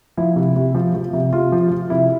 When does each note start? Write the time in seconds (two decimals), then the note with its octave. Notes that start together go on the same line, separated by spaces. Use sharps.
0.17 F3 E4
0.36 C3
0.56 C3
0.75 F3
0.95 F3
1.13 C3
1.33 C3 F4
1.52 F3
1.71 F3
1.90 C3 E4